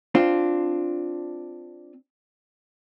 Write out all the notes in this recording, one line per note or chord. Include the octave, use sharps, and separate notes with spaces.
C4 D4 F4